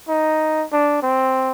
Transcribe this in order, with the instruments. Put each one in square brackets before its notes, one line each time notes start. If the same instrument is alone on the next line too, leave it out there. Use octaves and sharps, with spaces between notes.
[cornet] D#4
D4
C4